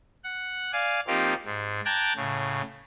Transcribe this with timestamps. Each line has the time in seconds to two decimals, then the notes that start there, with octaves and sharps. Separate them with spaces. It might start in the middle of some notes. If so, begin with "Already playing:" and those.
0.24 F#5
0.73 D5 F5 G#5
1.07 F3 A#3 C4 D#4 F4 G4
1.45 G#2
1.85 G5 A5 A#5 D6 F#6 G#6
2.16 A2 C#3